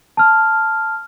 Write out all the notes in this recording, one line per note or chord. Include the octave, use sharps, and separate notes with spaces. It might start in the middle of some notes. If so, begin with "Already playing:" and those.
A5 F6